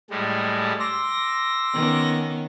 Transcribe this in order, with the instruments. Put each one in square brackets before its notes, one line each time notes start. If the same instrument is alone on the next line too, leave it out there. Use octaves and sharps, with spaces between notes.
[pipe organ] A2 G3 G#3
[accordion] C6 D6 E6 [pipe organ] A#6
[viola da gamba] D#3 B3 C#4